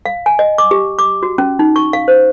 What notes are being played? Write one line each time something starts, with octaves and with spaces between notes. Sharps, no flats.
F5
G#5
D#5
D6
G4
D6
F#4
C#4
D#4
C#6
F5
C5